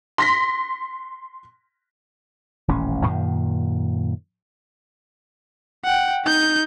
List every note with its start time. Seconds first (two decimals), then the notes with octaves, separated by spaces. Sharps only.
0.18 C6 A#6 B6
2.68 D#1 A1 C#4
3.05 F#2 A#2 D#3
5.85 F#5 G5
6.24 D#4 G6